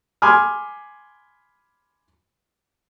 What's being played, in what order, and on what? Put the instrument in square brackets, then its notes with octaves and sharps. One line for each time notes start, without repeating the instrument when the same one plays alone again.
[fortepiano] G#5 B5 C6 D6 D#6 F6